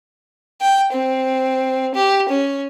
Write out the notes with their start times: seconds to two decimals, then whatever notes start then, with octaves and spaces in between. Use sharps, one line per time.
0.61 G5
0.92 C4
1.95 G4
2.29 C#4